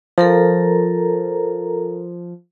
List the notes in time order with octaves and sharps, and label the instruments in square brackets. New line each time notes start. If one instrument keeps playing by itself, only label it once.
[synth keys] F3 [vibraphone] A4 A#4 A#5